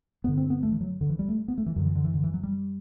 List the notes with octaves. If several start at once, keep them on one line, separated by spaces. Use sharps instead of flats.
G2 D3 B3
C4
B3
A3
E3
F#3
D3
E3
G3
A3
B3
A3
E3
F#2 D3 F#3
E3
D3
E3
D3
E3
F#3
G3